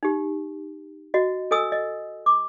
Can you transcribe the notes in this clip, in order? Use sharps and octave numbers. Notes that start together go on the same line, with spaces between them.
D#4 G4
F#4 D#5
A4 D#5 G#5 D#6 E6
D#5
D6